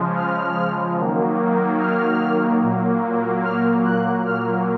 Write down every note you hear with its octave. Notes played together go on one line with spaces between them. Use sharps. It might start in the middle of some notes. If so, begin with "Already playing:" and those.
Already playing: C#3 F3 G#3
F6
D#3 F#3 A#3
F6
A#2 F#3 A#3
F6
F#6
A#2 F#3 A#3 F6